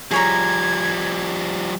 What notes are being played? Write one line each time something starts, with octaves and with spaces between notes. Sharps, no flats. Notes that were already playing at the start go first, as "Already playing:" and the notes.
F3 G3 G#4 C#5 A#5 G#6